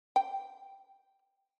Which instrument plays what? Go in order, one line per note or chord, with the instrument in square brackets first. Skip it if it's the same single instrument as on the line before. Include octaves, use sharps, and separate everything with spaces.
[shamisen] G5